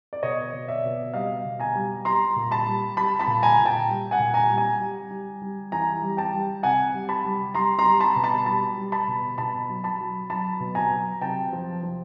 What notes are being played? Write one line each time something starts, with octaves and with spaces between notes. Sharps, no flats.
D5
B2 C#5 D#5
B2
D5 E5
B2
G3 D#5 F5
B2
G#5 A#5
G3
G3 A#5 C6
A#2
A5 B5
G3
G3 A5 B5
A5 B5
A#2
G#5 A#5
A#2
G5 A5
G3
F#5 G#5
A#2
G#5 A#5
G3
G#5 A#5
G3
G3
G3
E3 G#5 A#5
G3
G5 A5
G3
C3 F#5 G#5
G3
A5 B5
G3
G3 A#5 C6
A#5 C6
G3
A5 B5
B2
A5 B5
G3 A5 B5
G3
A5 B5
B2
B2 A5 B5
F#3
A5 B5
F#3
F#3 A5 B5
B2
G#5 A#5
F#3
C3 G5 A5
F3
F3